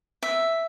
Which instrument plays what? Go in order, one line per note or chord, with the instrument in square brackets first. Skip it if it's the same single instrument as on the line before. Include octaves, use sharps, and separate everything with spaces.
[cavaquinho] E5